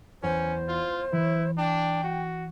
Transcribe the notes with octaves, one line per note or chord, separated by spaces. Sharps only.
E2 C#4 C5
F4 F6 A6
E3 E4
D4 G5
F#4